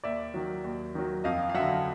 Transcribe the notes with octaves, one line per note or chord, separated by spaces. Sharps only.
D#2 D5 E5
D#3 F#3
D#2
D#3 F#3
F2 D#5 F5
F5
D3 F#3 E5 F#5